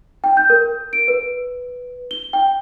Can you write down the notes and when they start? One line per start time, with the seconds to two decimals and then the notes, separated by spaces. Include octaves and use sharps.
0.24 G5
0.37 G6
0.50 A#4
0.93 D7
1.08 B4
2.11 G7
2.33 G5